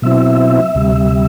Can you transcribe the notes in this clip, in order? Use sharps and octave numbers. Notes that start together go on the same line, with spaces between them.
B2 F#3 C4 E4 E5
D2 C3 G3